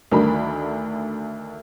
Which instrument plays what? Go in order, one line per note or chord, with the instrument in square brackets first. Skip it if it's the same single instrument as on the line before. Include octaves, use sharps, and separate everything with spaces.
[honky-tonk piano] D2 D#3 D4 A#4 B5